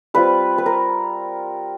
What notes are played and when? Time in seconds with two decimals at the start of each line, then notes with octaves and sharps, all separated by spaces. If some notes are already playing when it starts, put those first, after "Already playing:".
0.14 G3 C4 F4 B4
0.58 B4
0.66 A#4